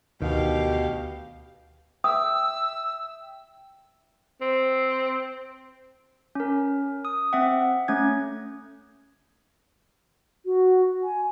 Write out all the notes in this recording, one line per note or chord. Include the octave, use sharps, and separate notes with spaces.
D2 B2 D#3 G4 F5
E5 G5 D#6 E6
C4
C#4 A#4
D#6
C4 E5 F#5
A3 C#4 G#6
F#4
G#5